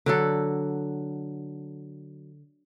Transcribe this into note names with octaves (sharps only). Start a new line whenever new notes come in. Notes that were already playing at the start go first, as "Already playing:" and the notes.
D3 F#3 A4